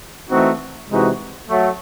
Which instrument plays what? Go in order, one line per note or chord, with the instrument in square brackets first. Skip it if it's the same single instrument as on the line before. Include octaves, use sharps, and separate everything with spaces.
[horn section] E3 A3 C4 D#4 F#4
C3 E3 G#3 D#4 F#4
F#3 A3